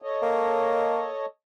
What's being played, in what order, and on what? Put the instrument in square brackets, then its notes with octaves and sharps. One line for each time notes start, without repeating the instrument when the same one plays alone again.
[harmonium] A4 C#5 D#5
[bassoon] A#3